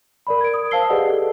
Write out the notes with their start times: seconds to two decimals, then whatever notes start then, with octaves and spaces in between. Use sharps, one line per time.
0.27 A#4 D5 B5
0.41 G#6 D7
0.53 A#4 D#6
0.71 C5 F5 A5 E6 C7 G7
0.90 G4 G#4 B4 D5 D#5 F#5
1.10 A4